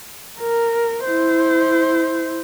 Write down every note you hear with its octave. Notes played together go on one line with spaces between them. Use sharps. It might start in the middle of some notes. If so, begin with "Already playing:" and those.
A#4
E4 C5